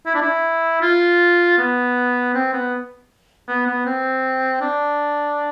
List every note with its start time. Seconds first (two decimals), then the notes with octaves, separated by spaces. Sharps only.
0.06 E4
0.15 D4
0.22 E4
0.82 F4
1.58 B3
2.34 C4
2.53 B3
3.48 B3
3.67 B3
3.85 C4
4.61 D4